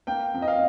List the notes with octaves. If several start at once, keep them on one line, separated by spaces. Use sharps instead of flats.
A#3 G5
F2
D#5
F5